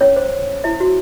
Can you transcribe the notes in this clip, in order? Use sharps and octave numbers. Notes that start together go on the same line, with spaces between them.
C#4 C#5
C5
E4 E5
F#4